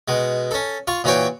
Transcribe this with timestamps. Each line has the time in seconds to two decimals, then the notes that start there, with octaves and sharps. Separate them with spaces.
0.08 B2 G#3
0.51 C#4 A4
0.87 F4 F5 C#6
1.04 A#2 E3 F#4 C#5 G5